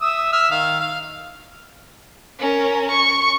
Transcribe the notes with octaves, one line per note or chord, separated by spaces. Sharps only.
E5 D#6 E6
E5 E6 F6
D#3 F5
F5
C#4 A#4
C#6